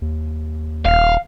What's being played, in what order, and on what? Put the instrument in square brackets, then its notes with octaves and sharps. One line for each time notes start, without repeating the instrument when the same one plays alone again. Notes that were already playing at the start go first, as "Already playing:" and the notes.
[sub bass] D#2
[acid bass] D#1 [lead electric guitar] F5